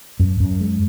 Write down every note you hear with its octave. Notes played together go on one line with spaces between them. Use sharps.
F#2
F#2
G#3